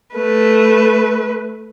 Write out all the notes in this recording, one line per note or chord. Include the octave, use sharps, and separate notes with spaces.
A3 B4